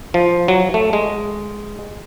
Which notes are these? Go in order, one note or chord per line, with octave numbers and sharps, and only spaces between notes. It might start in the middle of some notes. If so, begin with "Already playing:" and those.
F3
F#3
A3
G#3